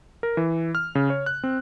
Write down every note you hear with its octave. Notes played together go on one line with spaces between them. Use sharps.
A#4
E3
F6
C#3
C#5
F#6
C4